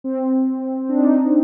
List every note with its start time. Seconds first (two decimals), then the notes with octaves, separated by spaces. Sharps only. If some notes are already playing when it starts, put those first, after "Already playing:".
0.04 C4
0.82 C4
0.89 D4
0.97 D#4